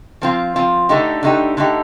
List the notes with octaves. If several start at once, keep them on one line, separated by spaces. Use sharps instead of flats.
F3 C4 F4
F3 C4 F4
D3 A3 D#4 G4
D3 A3 D#4 G4
D3 A3 D#4 G4